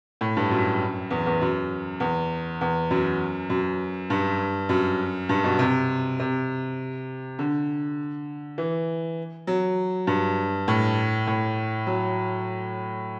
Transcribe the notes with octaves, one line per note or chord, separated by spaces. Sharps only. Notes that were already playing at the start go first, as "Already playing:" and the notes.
A2
G2
F#2
E2
E2
F#2
E2
E2
F#2
F#2
G2
F#2
G2
B2
C3
C3
D3
E3
F#3
G2
A2
A2
F#3